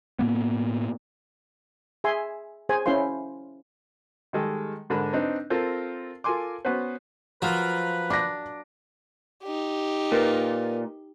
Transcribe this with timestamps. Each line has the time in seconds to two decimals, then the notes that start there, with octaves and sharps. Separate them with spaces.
0.19 A2 A#3 B3
2.04 G#4 E5 G#5 C6
2.69 G#4 C5 G#5
2.86 C#4 E4 C5 F5 C6
4.33 D#3 G3 G#3 A4
4.90 G#2 D3 D4 A#4 B5
5.13 C4 D4 D#4 B4
5.50 C4 F4 A4 A#4 C5
6.24 F4 A4 A#4 G#5 C6 D6
6.65 B3 C#4 F#4 B4 C5
7.42 F3 F#3 F4 A#4 B4
8.10 D4 D6 A#6
9.43 D#4 G4
10.12 A#2 A#4 B4